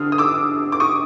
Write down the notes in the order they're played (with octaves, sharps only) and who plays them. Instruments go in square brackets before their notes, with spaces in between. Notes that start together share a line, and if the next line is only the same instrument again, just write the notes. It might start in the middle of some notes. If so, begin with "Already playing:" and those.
Already playing: [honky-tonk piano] D3 D#6 F6
D#6
D6 E6
D6
C#6 D#6